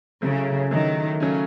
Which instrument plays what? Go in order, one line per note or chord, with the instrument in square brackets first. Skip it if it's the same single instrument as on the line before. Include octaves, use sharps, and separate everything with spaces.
[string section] C#3 [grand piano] F#3 A3 E4
[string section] D#3 [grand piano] F#3 A3 E4
[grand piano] C#3 F#3 A3 C#4